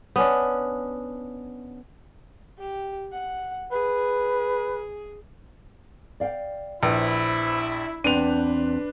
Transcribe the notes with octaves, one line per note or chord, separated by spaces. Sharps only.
B3 C#4 D4
G4
F#5
G#4 B4
D5 F5 G5
A#1 E4 B4 C5
E2 C4 D4 B4 D#7 F7